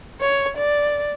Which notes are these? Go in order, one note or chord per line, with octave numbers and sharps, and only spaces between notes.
C#5
D5